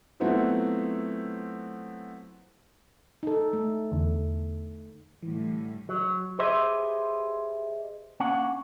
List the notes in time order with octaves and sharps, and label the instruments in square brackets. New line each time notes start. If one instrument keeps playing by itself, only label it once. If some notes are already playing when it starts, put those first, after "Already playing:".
[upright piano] F#3 A3 B3 C4 E4 F4
[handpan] D#4 A4
A3
[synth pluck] E2 D3
[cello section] A2 D3 G3 [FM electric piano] E3
[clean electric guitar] F#3
G4 G#4 B4 C5 D#5 E5
A#3 C#4 D4 F#5